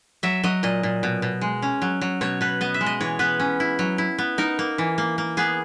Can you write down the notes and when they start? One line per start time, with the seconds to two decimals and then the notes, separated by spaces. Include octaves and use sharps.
0.23 F#3 E5
0.44 F#3 D#5
0.63 A#2 D#5
0.83 A#2
1.03 B2
1.22 B2
1.41 G#3
1.62 C#4
1.82 F#3
2.01 F#3
2.21 B2 C#5
2.41 B2 B4
2.61 B3 D#5
2.74 E5
2.81 G#3
2.86 D#5
3.01 E3 C#5
3.19 B3 B4
3.40 C#4
3.60 E4
3.79 F#3
3.98 E4
4.18 B3
4.38 D#4 A#4
4.59 A#3
4.78 E3
4.98 A#3
5.18 A#3
5.37 B3 G#4